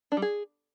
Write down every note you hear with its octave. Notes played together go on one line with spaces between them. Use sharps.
D4
G3
G#4